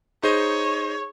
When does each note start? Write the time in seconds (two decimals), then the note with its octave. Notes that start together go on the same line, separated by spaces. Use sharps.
0.23 D#4 G#4 C5 C#5 D#5